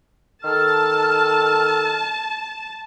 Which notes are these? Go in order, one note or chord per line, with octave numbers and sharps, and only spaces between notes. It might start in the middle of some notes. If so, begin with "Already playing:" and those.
D#3 A4 A5 F6